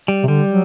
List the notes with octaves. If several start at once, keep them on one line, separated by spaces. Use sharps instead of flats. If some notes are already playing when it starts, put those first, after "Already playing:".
G3
C3
D3 G3
F#3